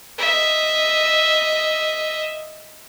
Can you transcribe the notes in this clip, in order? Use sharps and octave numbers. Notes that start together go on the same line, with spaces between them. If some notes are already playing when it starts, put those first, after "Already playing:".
D#5 E5